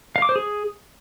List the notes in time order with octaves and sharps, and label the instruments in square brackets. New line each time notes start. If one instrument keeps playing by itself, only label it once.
[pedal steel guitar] F5
D6
C5
G#4